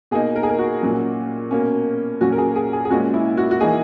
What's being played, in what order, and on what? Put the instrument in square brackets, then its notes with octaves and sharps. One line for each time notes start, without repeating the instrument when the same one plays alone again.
[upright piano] B2 A#3 D#4 G#4
A#4
G#4
A#4
F#4
A#2 F#3 C#4
B2 A#3 C#4
A#2 F#3 C#4 F#4
A#4
G#4
G#4
G#4
G#4
A#2 G#3 C#4 F#4
E4
F#4
F#4
E3 A#3 D#4 G#4